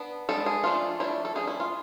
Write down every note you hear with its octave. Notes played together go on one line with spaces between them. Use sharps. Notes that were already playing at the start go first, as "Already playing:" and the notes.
Already playing: B3 D4
G#3 B3 D4 A4
G#4
F3 A3 D4 F4
F3 A3 D4 E4
A4
F3 A3 D4 G#4
E4
F4